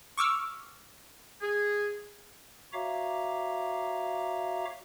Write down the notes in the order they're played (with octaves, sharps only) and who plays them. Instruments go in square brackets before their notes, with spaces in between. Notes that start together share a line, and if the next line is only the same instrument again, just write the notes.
[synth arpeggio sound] C#6 D6 E6 F6
[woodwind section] G#4
[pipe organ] F#4 C#5 E5 F5 A#5 D6